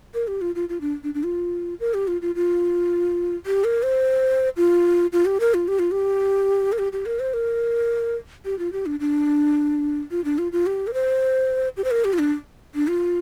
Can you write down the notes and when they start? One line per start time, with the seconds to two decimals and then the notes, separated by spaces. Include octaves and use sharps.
0.14 A#4
0.28 G4
0.41 F4
0.55 F4
0.69 F4
0.81 D4
1.04 D4
1.14 D4
1.25 F4
1.80 A#4
1.94 G4
2.08 F4
2.22 F4
2.35 F4
3.46 G4
3.64 A#4
3.83 C5
4.57 F4
5.13 F4
5.26 G4
5.40 A#4
5.54 F4
5.68 G4
5.79 F4
5.91 G4
6.72 A#4
6.79 G4
6.92 G4
7.06 A#4
7.20 C5
7.34 A#4
8.45 G4
8.59 F4
8.72 G4
8.86 D4
9.00 D4
10.11 F4
10.25 D4
10.38 F4
10.52 F4
10.66 G4
10.87 A#4
10.94 C5
11.77 G4
11.84 C5
11.91 A#4
12.05 G4
12.13 F4
12.19 D4
12.75 D4
12.88 F4